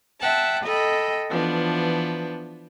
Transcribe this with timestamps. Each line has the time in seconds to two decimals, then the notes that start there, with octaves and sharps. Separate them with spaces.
0.21 E5 F#5 G5 A5
0.64 A4 D#5 G5 B5
1.29 E3 F3 B3 D4